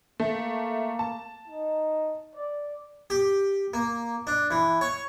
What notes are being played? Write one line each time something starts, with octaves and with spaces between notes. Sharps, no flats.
A3 A#3
A5
D#4
D5
G4
A#3
D4
E3
C#5